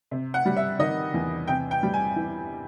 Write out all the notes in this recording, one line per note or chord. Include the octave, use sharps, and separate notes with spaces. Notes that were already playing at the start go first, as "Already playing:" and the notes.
C3
F#5
G3
E5
D#3 D#5
E2
C3 G5
G5
G3
G#5
E3